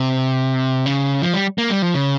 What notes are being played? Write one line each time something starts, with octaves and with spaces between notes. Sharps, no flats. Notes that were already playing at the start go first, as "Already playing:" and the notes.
Already playing: C3
C#3
F3
G3
A#3
G3
F3
C#3